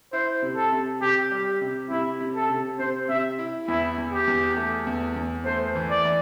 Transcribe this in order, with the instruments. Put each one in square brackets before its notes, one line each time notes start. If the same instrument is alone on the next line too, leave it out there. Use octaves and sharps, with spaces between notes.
[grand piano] E4 [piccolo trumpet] C5
[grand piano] C3
[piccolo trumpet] A4
[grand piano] C3
[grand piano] C3 [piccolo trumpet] G4
[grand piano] G3
[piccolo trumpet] G4
[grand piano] C3
[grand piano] C3 [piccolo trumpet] E4
[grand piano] C3
[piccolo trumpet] A4
[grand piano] C3
[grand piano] C3 [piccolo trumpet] C5
[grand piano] C3 [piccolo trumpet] E5
[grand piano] E4
[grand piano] E2 [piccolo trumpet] E4
[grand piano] E2
[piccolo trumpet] G4
[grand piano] E2
A3
E2
E2
[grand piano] A3 [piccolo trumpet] C5
[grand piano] E3
[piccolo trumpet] D5
[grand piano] E3